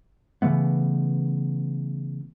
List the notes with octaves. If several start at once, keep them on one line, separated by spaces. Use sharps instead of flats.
C#3 E3 A3 B3